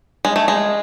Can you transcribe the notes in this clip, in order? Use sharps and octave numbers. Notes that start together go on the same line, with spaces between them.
G#3
A3
G#3